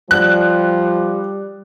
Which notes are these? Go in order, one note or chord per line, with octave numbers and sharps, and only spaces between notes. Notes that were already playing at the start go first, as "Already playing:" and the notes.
F3 G3 F#6